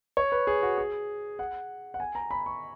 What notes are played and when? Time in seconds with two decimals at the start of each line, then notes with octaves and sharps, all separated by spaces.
0.17 C#5
0.32 B4
0.47 G#4
0.63 F#4
0.78 G#4
1.39 F#5
1.94 F#5
2.00 G#5
2.15 A#5
2.31 B5
2.46 C#6